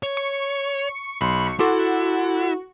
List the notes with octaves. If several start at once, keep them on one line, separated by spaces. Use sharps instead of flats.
C#5
C#6
B1 B5 C6
E4 F#4 A4 C6 D6